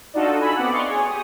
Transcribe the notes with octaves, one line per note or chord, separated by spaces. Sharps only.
D4 D#4 F4 F#4 A4 D#5
F#4 A4 G#5 B5 E6
B3 C4 D5 F#5
D5 D#5 F5 C6 C#6
G#4 C#5
G4 G#4 D#6